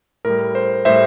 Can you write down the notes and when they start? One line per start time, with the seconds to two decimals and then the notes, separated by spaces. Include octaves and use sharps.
0.25 A2 G3 A#4
0.55 C5
0.85 A2 G3 C5 E5